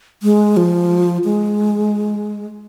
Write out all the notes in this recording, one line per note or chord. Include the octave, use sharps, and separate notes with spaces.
G#3
F3
G#3